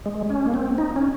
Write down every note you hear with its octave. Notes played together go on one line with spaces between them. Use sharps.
G#3
C#4
A#3
C4
D#4
C#4